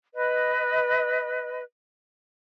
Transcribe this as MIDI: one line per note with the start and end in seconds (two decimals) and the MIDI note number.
0.14 1.62 71
0.14 1.62 75